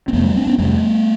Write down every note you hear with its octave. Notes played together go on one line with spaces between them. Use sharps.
C4
F2 C3 A3 B3
G3 A3
C4 D4
B3 C#4
F2 C3 G3 A3